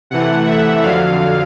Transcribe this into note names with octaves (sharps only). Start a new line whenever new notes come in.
C3 E3 A3 F#5
E5
F2 D3 F#3 F5